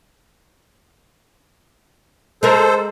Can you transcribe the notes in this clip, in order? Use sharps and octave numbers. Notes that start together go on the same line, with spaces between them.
G#3 A4 A#4 C5